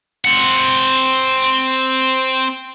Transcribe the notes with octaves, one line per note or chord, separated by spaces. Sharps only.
C4 F#5